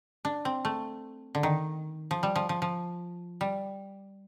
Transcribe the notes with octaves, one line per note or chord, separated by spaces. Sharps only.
D4
C4
A3
D3
D#3
F3
G3
F3
F3
F3
G3